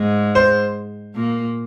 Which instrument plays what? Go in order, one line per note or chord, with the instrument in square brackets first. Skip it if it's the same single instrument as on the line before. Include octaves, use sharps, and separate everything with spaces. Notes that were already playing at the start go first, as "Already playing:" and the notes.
Already playing: [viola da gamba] G#2 G#3
[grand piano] C5
[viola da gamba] A#2 A#3